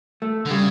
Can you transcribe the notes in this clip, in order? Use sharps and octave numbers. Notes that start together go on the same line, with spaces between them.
A3
D3
C#3 G3